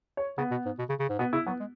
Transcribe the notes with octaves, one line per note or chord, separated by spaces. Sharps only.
C#5
C#3 B3
B2
G#2
B2
C#3
C#3
G#2
B2 B3
C#3 E4
F#3 B3
G#3